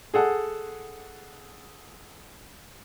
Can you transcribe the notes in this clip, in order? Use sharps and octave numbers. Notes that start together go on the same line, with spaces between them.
G#4 A4 F#5